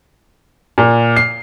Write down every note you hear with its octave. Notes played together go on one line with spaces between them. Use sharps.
A#2
C7